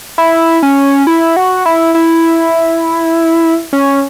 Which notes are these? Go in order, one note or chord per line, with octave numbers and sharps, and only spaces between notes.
E4
C#4
E4
F#4
E4
E4
C#4